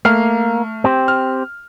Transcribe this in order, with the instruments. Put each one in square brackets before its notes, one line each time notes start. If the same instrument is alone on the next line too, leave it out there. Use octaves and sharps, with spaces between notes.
[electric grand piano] A3 F6 C7 [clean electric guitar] A#3
[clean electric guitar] C4 G4 C5
[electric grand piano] F6